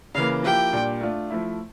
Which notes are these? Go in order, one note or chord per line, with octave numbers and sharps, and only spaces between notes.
C#3 E3 A#3 F5
F3 A#3 E4 G4 G5
A#2 G3 D4
A3 D4 F4
F3 A3 E4